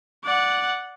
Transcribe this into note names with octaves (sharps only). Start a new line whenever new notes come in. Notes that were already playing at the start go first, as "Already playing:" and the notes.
D5 F#5